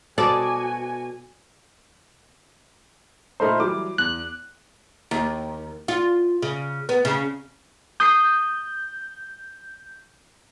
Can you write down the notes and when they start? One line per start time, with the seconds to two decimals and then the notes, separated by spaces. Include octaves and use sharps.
0.18 B2 F#4 A4 D5 G#5
3.40 A#2 A3 D#4 C5 B5 F6
3.60 E3 F#3 G3 D6
3.98 E2 F#6
5.11 D#2
5.88 F4
6.42 C#3
6.89 B3
7.05 C#3
8.00 D#6 G6 C7 D#7